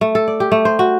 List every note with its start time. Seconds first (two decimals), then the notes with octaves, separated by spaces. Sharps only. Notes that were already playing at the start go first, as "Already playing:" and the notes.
0.01 A3
0.15 A4
0.28 D5
0.40 G4
0.52 A3
0.65 C5
0.79 F#4